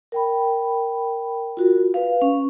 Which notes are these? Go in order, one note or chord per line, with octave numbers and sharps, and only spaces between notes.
A#4 G5 B5
F4 F#4 A#4
B4 F5
C#4